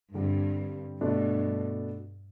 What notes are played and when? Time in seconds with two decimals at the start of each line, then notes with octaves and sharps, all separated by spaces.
0.14 G2 D3 G3 C4 G4
1.01 G2 B2 A3 D4